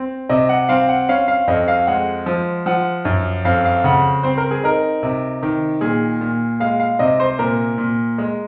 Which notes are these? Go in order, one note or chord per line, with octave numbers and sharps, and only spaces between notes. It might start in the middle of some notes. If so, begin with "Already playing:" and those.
Already playing: C4
C3 D#5
F#5
C4 F5
F#5
C#4 F5
F5
F2 D#5
F5
G#3 F#5
F3
F3 F#5
F#2
F2 F5
F5
C#3 F#5
C4 C5
A#4
G#4
D#4 A#4
C3
D#3
A#2 G#4
A#2
G#3 F5
F5
C3 D#5
C5
A#2 A#4
A#2
G#3